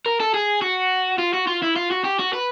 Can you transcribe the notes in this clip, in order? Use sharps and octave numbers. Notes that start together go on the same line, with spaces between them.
A#4
A4
G#4
F#4
F4
F#4
F4
E4
F4
F#4
G4
F#4
B4